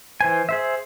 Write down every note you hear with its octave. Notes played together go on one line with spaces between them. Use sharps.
E3 C5 G#5
G#4 C5 E5